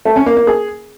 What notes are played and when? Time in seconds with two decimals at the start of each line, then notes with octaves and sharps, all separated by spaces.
0.05 A3
0.16 C#4
0.26 A#3
0.37 A#3
0.47 G#4